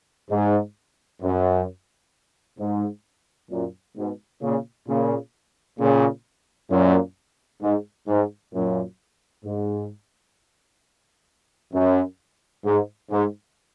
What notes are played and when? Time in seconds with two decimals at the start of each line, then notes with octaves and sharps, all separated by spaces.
0.31 G#2
1.22 F#2
2.59 G#2
3.51 F#2 A#2
3.96 G#2 B2
4.42 A#2 C#3
4.87 A#2 C#3
5.79 A#2 C#3
6.70 F#2 A#2
7.62 G#2
8.08 G#2
8.54 F#2 A#2
9.45 G#2
11.73 F#2
12.65 G#2
13.11 G#2